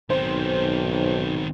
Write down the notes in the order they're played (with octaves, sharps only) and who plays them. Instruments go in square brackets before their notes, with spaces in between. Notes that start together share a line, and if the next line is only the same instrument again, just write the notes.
[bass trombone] B1 [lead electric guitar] D#3 C4 [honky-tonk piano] C5